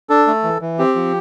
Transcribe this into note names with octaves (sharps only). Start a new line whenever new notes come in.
D4 A4
A3
E3
E3
C4 G4
F3